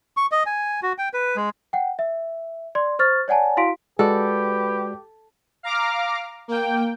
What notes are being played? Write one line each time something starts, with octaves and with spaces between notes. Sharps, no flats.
C#6
D#5
G#5
F#4
G5
B4
G#3
F#5 G5
E5
D5 C6
C5 C#6 F6 A6
C#5 D5 F#5 G#5 A5
E4 F#4 F5 C6 B6 D7
G#3 F#4 G4 A4 B4 D5
F5 A#5 D6 F6
A#3 G5